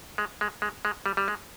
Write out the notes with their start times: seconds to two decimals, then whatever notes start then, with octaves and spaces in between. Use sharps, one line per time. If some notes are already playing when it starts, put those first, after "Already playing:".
0.18 G#3
0.41 G#3
0.62 G#3
0.85 G#3
1.06 G3
1.17 G3
1.28 G#3